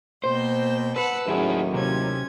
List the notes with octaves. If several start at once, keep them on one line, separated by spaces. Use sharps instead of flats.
B2 A#3 C5 G5
B4 F#5 A5 E6
D#2 A2 F#3 C#4 E4 G#4
C3 C#4 G#6